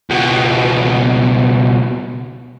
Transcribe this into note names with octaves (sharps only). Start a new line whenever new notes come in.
C#2 B2